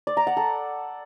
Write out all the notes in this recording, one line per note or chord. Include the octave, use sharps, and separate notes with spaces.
D5
A#5
F#5
A4